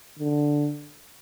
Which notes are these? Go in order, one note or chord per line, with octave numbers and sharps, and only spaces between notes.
D3